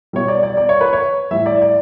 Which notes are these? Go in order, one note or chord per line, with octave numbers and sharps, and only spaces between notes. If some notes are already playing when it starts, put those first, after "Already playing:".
B2 G3 C#5
D5
D5
D5
C#5
B4
C#5
A2 E3 G3 E5
D5
D5